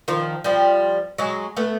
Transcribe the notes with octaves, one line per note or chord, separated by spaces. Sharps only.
D#3 F3
F3 G3
F#3 G#3
A3 B3